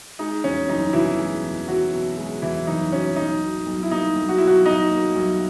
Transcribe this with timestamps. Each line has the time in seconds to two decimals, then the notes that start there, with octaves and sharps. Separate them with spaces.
0.19 G#3 D#4
0.44 E2 C#4
0.69 F#1 D#4
0.93 B2 E3 E4
1.18 G#3
1.43 E2
1.68 F#1 F#3 F#4
1.93 B2
2.17 G#3
2.42 E2 E3 E4
2.67 F#1 D#4
2.92 B2 C#4
3.16 B1 D#4
3.41 B2
3.66 B1
3.83 E4
3.91 A#3 D#4
4.15 B1
4.29 F#4
4.38 B2 E4
4.47 F#3 F#4
4.65 B1 D#4 D#5
4.90 A#3
5.14 B1